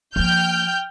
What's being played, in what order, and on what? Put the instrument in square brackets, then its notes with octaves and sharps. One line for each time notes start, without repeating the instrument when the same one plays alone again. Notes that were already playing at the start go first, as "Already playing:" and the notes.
[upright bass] F3 A#3 [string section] G5 F6 G6